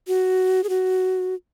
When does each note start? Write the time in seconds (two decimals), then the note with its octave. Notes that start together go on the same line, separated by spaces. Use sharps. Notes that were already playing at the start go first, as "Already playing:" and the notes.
0.07 F#4
0.64 G#4
0.69 F#4